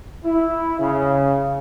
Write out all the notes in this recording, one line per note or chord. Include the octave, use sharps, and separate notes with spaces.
E4
C#3